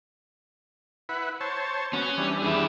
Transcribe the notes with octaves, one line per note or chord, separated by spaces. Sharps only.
E4 B4 F#5
C5 C#5 A5
B3 C#4 F#4
E3 G3 D4
E4 G#4